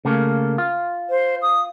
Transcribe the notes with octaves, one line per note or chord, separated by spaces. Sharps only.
C#3 A3 A#3
F4
C5
D#6